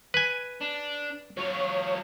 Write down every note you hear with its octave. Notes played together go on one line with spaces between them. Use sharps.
B4 G#5
D4
F#3 F4 C#5